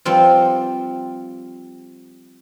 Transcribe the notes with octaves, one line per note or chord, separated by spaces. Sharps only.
F3 G3 C4 F4